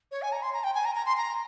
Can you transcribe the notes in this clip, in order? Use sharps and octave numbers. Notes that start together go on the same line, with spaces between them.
C#5
G#5
A#5
C6
A#5
G5
G#5
A#5
A#5
C6
A#5